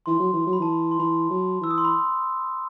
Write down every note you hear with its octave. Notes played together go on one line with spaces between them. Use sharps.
E3 C6
F#3
E3
F#3
B5
E3 A5
B5
C6
E3 B5
F#3
E3 E6
D#6
C6
B5